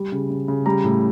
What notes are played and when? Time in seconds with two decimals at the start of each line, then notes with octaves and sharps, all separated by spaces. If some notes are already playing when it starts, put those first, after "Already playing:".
Already playing: G3
0.12 C#3
0.30 C#3
0.48 C#3
0.66 G3 A#5
0.84 A2